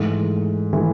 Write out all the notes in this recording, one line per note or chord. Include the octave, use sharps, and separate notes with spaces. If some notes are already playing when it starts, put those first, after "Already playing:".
Already playing: G#2 E3 A3
E3 A3